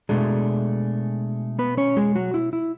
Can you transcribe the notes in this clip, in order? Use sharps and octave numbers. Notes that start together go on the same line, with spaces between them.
B2 G#3 A3 D4 G#4
B3 B4
C#4 C#5
G#3 G#4
F#3 F#4
E4
E4